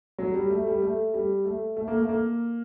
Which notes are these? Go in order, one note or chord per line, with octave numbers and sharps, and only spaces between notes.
F#3
G3
A3
G3
A3
G3
A3
A3
A#3
A3
A#3